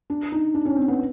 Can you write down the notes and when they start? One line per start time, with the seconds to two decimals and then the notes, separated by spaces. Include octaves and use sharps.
0.10 D4
0.32 D#4
0.54 D4
0.65 C#4
0.76 C4
0.88 B3